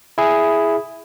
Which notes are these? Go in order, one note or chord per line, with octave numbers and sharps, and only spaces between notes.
E4 G#4